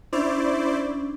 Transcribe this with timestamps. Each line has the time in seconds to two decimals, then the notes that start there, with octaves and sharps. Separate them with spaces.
0.13 C#4 D4 E4 C5 D5